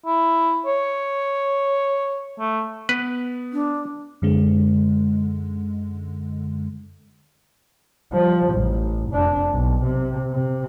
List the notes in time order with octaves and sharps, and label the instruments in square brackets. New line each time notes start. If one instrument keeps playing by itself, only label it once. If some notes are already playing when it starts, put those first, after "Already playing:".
[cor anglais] E4
C#5
A3
[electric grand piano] B3 [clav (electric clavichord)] B4
[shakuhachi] D4
[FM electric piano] F#2 D3 G#3
[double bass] F3 G3
A1
F1 D4
B1
C3
C3